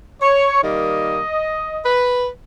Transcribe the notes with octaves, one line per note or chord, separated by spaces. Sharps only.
C#5
D#3 G3 A#3 D#5
B4